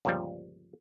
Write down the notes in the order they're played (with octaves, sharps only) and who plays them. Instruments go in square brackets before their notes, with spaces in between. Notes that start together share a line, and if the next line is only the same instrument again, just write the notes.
[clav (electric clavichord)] G1 C#2 A#2 C#3 F3 G3